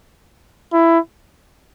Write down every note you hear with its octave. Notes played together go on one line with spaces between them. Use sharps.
E4